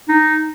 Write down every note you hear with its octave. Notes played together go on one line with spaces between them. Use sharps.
D#4